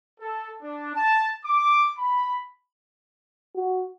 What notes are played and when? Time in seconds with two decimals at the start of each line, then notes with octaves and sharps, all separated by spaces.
0.20 A4
0.63 D4
0.95 A5
1.45 D6
1.98 B5
3.55 F#4